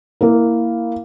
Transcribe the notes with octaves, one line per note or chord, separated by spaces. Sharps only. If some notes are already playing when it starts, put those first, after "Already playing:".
A#3 E4 A#4